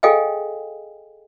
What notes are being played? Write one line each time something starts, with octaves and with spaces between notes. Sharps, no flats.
G#4 A4 D#5 F5 G5 G#5